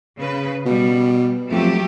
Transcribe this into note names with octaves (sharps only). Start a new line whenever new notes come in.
C#3 B4
B2 G3
F2 F#3 A3 G4